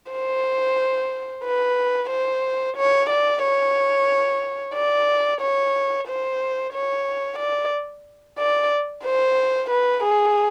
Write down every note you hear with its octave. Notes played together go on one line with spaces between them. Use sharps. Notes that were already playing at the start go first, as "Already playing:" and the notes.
C5
B4
C5
C#5
D5
C#5
D5
C#5
C5
C#5
D5
D5
C5
B4
G#4